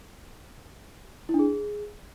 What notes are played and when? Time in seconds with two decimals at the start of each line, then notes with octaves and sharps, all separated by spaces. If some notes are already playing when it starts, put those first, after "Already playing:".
1.29 E4
1.34 D4
1.39 G#4